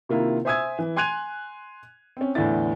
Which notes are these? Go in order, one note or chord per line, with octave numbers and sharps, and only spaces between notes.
C3 D#3 A#3 E4 F4
C5 E5 G#5 D#6 E6 G#6
E3
G#5 C6 F#6 G#6 D#7 F7
C4 C#4
E2 A2 D3 D4 E4 A6